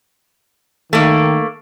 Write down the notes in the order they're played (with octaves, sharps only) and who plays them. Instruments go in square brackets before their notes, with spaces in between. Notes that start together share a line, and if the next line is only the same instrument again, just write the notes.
[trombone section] D#3 [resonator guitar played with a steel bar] A3 A#3